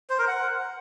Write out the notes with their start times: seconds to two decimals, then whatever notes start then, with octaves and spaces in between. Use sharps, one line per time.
0.10 C5
0.19 A#4
0.28 F#5